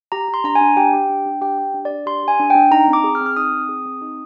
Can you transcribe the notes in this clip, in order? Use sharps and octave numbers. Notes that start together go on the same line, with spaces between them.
G4 A#5
G4
C6
D4 A#5
G#5
D4
G4 G5
G4
D4
D4
G4 G5
G4
D4
D5
D4
G4 C6
G4 G#5
D4
D4 G5
D#4 A#5
C4
D6
G#4
F6
C4
F6
D#4 D#6
C4
G#4
C4
D#4